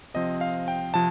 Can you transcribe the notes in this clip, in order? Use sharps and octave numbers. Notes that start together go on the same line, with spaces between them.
C3 F3 C4 D#5
F5
G5
C3 F3 A5